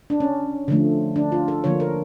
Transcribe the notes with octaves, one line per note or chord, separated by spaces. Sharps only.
D4
C#4
D3 F3 A3
D4
F4
A4
D3 F3 A#3 C#5
A#4